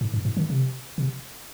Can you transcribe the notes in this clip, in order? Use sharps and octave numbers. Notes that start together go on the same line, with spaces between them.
G#2
G2
G#2
D#3
C3
C3